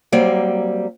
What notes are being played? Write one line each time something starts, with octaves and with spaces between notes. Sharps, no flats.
F#3 G3 A#3 C4